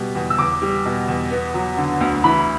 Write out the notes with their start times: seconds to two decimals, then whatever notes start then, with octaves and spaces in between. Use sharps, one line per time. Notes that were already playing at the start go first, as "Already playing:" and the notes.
Already playing: B2 G3 B3
0.15 E2
0.30 E6
0.38 E2 D6
0.62 G3
0.85 B2
1.08 E2
1.31 B3
1.54 F#3
1.77 D3
2.01 D2
2.24 E3 B5